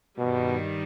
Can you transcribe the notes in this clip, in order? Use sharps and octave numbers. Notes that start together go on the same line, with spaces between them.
G2 B2 D#3 G3